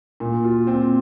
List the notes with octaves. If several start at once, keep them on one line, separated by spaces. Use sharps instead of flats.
A#2
F4
C4